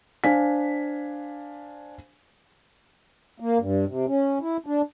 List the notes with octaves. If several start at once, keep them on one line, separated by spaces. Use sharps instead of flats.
D4 C5 F5 G#5 B6
A#3
G2
C3
C#4
E4
D4